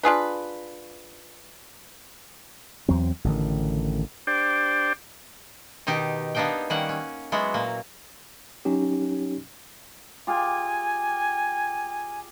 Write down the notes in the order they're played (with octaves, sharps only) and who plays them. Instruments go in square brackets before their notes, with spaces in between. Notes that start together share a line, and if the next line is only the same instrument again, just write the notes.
[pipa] D4 F4 G#4 B4
[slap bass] E2 F#3 C4
A1 D3 D#3
[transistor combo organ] D4 G4 C5 D5 G5
[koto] B2 D#3 D#4 G4
A#3 B3 D4 D#4 F5 G5
D#3 G3 A#3 C#4 F#5
C#4
F#3 G#3 B3 E4 F#4
A#2 A#3
[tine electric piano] F#3 C#4 D#4 G4
[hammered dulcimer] F4 G4 G#4 [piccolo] G#5